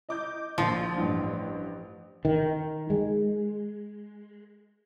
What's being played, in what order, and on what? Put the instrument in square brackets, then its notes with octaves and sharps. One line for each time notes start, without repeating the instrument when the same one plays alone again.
[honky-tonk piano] D#5 D6 G6
[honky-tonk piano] A#1 A#2 [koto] F3
[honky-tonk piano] A1 G2
[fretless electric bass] D#3
G#3